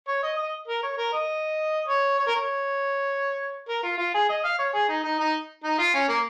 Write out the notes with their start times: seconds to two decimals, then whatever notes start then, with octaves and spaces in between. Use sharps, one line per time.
0.08 C#5
0.23 D#5
0.38 D#5
0.68 A#4
0.83 C#5
0.98 A#4
1.13 D#5
1.88 C#5
2.19 C#5
2.27 A#4
2.36 C#5
3.68 A#4
3.83 F4
3.98 F4
4.14 G#4
4.29 D#5
4.44 F5
4.58 C#5
4.74 G#4
4.88 D#4
5.03 D#4
5.19 D#4
5.63 D#4
5.78 F4
5.94 C#4
6.08 A#3